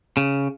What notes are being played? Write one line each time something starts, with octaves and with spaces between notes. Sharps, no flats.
C#3